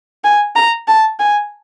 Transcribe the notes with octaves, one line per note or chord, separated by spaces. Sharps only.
G#5
A#5
A5
G#5